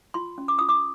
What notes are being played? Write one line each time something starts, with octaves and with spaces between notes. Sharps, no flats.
F4 C6
C#4
D6
F4 D#6
D6